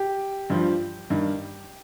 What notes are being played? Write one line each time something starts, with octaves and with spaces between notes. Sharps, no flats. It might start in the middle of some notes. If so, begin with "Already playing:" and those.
Already playing: G4
G2 F3
G2 D#3